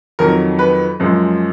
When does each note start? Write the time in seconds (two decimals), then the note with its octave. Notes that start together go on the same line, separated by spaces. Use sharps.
0.19 F2 D#3 F#3 A#4
0.59 B4
1.00 F#2 F3 G#3